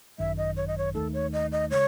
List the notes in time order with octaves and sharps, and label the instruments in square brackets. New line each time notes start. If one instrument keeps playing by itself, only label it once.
[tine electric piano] G#1 F#2 D#3 F#3 [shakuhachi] E5
[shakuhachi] D#5
C#5
D#5
C#5
[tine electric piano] D#2 D#3 A3 D#4 [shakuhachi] A4
[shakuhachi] C#5
D#5
D#5
[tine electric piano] C#3 G#3 [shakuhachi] C#5